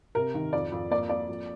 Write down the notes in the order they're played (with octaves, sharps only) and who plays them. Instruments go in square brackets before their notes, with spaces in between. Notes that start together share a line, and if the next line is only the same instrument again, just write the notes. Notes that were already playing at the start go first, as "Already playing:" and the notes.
[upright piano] C3 A#4
D#3
F2 D5
F2
A#3 D5
A#3 D5
F2